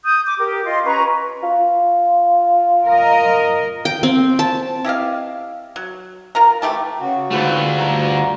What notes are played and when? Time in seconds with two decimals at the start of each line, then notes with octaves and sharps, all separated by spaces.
0.05 D#6 G6
0.25 D6
0.39 G4 A#4
0.65 F4 D#5 C6
0.85 C#4 B4 A#5 C#6
1.43 F4
2.87 A#4 D#5
3.85 G5
4.03 C4
4.39 A5
4.85 E4 G4 D#5 F5
5.76 F#3
6.35 F4 A#4 A#5
6.62 E3 A3 G4 A5
7.00 C#3 F#4
7.31 D2 G#2 A3 C4 F4 F#4 B4
7.78 G2 F#5 A#5